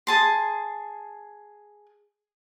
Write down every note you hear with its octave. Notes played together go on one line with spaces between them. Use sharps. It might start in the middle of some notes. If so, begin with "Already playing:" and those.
G#4 A5 C6